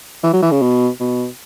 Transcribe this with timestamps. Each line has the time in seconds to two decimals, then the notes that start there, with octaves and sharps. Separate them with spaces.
0.23 E3
0.33 F#3
0.42 E3
0.52 C#3
0.62 B2
1.00 B2